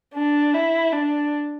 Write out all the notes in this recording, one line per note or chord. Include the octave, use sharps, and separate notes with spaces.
D4
E4
D4